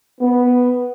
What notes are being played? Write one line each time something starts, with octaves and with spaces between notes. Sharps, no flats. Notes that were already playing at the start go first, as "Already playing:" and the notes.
B3